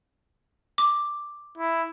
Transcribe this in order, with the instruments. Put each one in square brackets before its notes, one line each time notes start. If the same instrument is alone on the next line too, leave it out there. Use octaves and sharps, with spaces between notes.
[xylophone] D6
[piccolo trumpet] E4